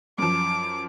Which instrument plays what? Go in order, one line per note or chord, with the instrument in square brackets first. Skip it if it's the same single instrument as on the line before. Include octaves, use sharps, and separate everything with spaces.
[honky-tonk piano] F#2 F3 [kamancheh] D6